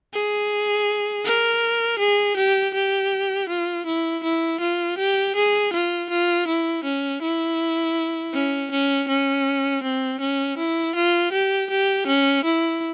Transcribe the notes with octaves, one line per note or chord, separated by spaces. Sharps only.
G#4
A#4
G#4
G4
G4
F4
E4
E4
F4
G4
G#4
F4
F4
E4
C#4
E4
C#4
C#4
C#4
C4
C#4
E4
F4
G4
G4
C#4
E4